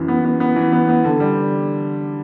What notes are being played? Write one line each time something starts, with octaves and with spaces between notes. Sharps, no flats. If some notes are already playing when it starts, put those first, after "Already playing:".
Already playing: F#2 E3
B3
B3
B3
E3
B3
B3
D3
G3